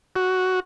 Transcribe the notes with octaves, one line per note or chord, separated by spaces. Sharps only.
F#4